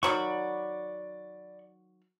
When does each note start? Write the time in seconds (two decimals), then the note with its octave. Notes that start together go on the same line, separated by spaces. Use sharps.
0.03 D#3 F#3 F#4 D5 B5 C#6